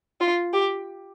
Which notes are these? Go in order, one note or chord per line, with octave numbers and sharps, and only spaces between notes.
F4
G4